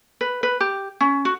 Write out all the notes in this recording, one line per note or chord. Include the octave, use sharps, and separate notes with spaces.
B4
B4
G4
C#4
F#4